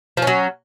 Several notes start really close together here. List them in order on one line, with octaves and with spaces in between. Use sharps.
F3 C#4 F#3